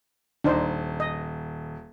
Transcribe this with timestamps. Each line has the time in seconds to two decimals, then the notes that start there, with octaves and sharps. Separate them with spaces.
0.44 D#1 D4 D#4 C5
1.00 D#5